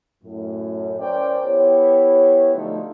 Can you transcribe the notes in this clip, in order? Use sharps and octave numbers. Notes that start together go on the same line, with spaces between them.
F#2 A2
C#4 A#4 C5 D5 G5
B3 E4 G4 C#5
D3 F3 F#3 A3 D#4 A4